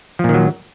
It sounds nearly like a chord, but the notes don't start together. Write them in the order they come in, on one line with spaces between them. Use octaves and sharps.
F3 A#2 D#3 F#3